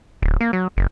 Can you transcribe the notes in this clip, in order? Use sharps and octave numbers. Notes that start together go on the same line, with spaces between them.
D1
A#3
F#3
F#1